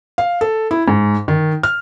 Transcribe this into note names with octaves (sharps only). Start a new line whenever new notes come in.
F5
A4
E4
G#2
D#3
F6